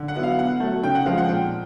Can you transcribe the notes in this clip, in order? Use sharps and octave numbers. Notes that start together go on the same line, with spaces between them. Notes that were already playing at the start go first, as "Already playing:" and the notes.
Already playing: D3
F#5
F#3 B3 E4
F5
B2 F#5
F#3 A3
C#3 G5
F#5
F3 G#3 C4 F5
F#5
A#2 G5